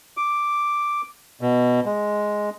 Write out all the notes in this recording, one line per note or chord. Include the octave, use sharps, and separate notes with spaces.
D6
B2
G#3